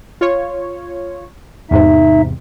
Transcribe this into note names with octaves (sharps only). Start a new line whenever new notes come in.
F4 C#5
E2 G#2 C3 D#4 E5